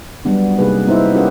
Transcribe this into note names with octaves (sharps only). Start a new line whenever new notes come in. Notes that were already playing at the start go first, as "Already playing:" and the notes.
F#3 G3 B3 D4
C3 A#3 D#4 G4 G#4 B4
B3 D#4 E4 C5 E5
C#4 F4 G4 A#4 B4 F#5